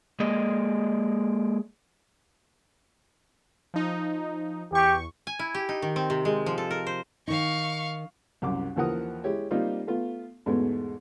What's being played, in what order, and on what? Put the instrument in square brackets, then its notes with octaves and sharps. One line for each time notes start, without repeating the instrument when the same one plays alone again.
[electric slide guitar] G#3 A#3 G#4 D5 D#5
[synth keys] F3 D#4
[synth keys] E2 C#6 [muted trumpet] G4
[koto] G#5
E4
G4
D#4
D#3
C4
C3
G#3
F3
A4
A#4
C5
[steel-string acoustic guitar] D#3 D#4 [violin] F5 C#6
[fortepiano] C2 F#2 D6
D#2 E3 F3 A#4 F#5 D#6
G#3 E4 G4 C#5
G3 A#3 C4 D#4 F4
A3 B3 F4
E2 G#2 B2 G#3 A3 B3